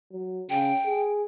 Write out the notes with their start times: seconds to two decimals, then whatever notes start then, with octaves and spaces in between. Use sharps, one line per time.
0.12 F#3
0.50 C#3 G5
0.87 G#4